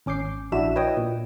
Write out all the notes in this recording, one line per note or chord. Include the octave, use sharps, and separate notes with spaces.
G#1 C#4 D6 G6 C7
A#1 D4 E4 F#4 E5 E7
E4 B4 C#5 D#5 G5 D#6
A#2